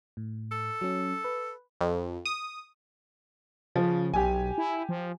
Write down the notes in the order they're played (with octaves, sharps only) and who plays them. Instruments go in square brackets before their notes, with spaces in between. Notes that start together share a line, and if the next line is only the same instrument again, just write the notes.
[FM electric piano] A2
[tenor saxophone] A4
[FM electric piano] F#3 C#4
B4
[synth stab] F2
D#6
[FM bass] C#3 [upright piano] F3
[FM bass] B1 [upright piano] G4 G#5
[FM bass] E4
F3